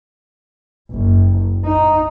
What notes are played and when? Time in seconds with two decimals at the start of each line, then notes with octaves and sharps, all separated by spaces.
0.91 F#1
1.65 D#4